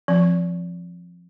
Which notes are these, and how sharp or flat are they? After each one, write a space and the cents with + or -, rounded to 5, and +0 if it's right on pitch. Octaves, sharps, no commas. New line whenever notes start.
F3 +0 C4 +25